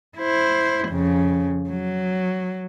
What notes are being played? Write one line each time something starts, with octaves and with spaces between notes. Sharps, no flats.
E4 C5
F2 C#3
F#3